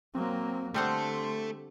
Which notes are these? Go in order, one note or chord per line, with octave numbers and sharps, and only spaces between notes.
F#3 A#3 C4
D3 G3 A3 C4 A4 F#5 C6